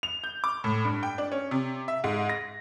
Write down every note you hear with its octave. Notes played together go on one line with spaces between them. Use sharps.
F7
G6
D6
A2
G2
G5
D4
C#4
C3
E5
G#2
A#6